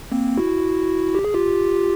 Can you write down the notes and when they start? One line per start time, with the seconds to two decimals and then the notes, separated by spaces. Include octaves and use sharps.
0.12 A#3 C4
0.38 E4 F#4
1.15 G4
1.25 G#4
1.34 F4 G4